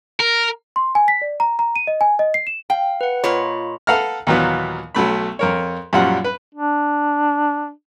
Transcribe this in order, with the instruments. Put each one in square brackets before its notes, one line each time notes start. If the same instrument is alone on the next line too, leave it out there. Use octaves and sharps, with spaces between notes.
[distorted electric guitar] A#4
[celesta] C6
G#5
B6
D5
A#5
A#5
D#7
D#5
G#5
D#5
C7
E7
[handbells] F5 [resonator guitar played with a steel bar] G5
[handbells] B4 F#5
[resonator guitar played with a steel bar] A#2 C#5 [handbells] F4 D#5 B5
[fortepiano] A4 B4 F5 F#5 A#5 F6
D#2 A#2 E3 F#3 B3
B1 F#3 A3 B5
F2 A#4 C#5
F#2 A#2 F3 G3 F#4 F#5
B4
[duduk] D4